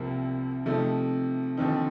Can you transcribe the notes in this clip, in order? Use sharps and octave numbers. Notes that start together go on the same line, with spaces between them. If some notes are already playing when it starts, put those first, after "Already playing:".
Already playing: C2 C3 F3 A#3
C3 F3 A3 D#4
D#2 D3 F3 C4 D#4